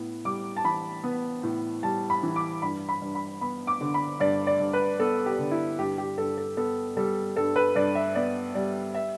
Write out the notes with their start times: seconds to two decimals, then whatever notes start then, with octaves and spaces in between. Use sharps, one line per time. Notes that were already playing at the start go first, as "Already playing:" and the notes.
Already playing: A2 B3
0.25 G3 D6
0.56 A5
0.64 E3 B5
1.03 B3
1.43 A2
1.83 G3 A5
2.10 B5
2.23 E3
2.36 D6
2.62 G2 B5
2.89 B5
3.02 G2
3.15 B5
3.41 B3 B5
3.67 D6
3.81 D3
3.94 B5
4.20 G2 D5
4.47 D5
4.60 G2
4.73 B4
4.99 B3 A4
5.26 G4
5.39 D3
5.51 E4
5.78 G2 G4
5.98 G4
6.17 G2 A4
6.38 A4
6.57 B3 A4
6.97 G3 A4
7.36 G2 A4
7.56 B4
7.75 G2 D5
7.95 E5
8.15 B3 D5
8.55 G3 D5
8.94 E5